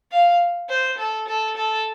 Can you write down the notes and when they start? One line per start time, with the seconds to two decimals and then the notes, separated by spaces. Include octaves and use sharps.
0.12 F5
0.69 C5
0.98 A4
1.28 A4
1.57 A4